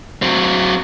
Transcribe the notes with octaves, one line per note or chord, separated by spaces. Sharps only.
F#3 C4